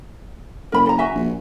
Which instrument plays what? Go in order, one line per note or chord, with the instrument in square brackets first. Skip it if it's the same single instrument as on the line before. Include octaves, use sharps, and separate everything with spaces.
[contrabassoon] F#1 [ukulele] A#4 B5
[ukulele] A4 A#5
F#4 E5 G#5
[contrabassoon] A#1